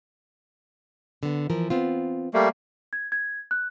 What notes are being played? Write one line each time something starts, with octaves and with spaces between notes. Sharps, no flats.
D3 B3
E3 F3 A#4
B3 C4 F4
G3 A3 A#3
G#6
G#6
F#6